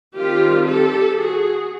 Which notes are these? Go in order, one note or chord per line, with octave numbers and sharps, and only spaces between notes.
D#3 G3 C4 F4 G4
G4 A4
F#4 G#4